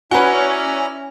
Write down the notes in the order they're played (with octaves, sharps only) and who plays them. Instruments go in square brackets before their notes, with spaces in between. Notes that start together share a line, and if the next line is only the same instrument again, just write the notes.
[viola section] C#4 [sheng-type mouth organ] E4 D5 A#5 [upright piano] F#4 B4 [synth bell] G#5